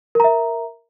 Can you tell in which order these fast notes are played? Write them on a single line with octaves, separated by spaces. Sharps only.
A#4 A#5 E5